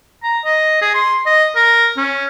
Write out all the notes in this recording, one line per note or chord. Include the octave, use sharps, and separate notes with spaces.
A#5
D#5
G#4
C6
D#5
A#4
C#4